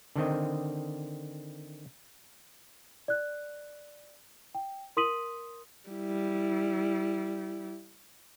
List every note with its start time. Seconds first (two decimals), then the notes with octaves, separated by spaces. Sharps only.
0.16 D3 D#3 C4 D#5
3.08 D5 F#6
4.55 G5
4.97 A#4 C6 D#6 B6 D#7 F#7
5.89 G3 E4